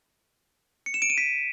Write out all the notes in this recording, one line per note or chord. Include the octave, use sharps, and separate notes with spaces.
C#7
E7
D7
D#7
B6